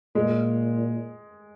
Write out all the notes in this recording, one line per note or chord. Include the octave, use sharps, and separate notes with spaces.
A#2 G#3